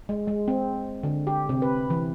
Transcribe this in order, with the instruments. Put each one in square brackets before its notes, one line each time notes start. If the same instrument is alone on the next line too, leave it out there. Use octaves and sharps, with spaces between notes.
[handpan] G#3
G#3
C4
D3
G4
C3
B4
E3